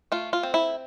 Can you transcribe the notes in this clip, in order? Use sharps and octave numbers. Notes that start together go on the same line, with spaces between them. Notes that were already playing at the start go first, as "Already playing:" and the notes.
A3 F4
F4
C4
E4